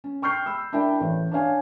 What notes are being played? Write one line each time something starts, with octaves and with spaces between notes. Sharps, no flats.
C#4
G5 C#6 F6 G6 C7
B5 E6
D4 E4 A#4 G5
A1
D4 C#5 F5 G#5